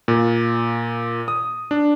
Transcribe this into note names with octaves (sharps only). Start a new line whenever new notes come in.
A#2
D#6
D4